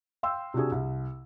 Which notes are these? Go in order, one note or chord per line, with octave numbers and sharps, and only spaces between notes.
F5 G5 C6 E6
C3 D4 F#4 G#4
C2